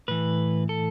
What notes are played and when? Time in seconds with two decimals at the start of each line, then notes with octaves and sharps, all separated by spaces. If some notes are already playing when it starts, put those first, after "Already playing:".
0.08 A2 E3 B4
0.69 A4